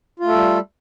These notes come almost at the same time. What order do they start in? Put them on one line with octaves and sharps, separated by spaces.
F4 A3 A4 G3